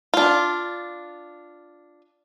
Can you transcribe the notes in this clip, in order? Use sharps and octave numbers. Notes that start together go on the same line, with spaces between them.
D4 F4